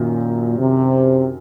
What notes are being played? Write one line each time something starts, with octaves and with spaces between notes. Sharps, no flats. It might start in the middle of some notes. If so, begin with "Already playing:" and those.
Already playing: F#2 A#2 D#3
C3